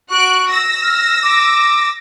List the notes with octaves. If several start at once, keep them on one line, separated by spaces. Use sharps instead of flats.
F#4 C#6 F#6 D7
E6 A#6
F6
D6